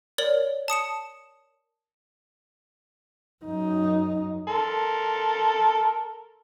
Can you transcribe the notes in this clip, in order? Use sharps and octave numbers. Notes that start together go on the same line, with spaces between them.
A#4 C#5 D5 F#7
A5 D#6 C#7 E7
F#2 D#4
A4 A#4 C6